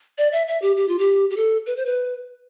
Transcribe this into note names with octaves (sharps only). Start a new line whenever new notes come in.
D5
E5
E5
G4
G4
F4
G4
G4
A4
B4
C5
B4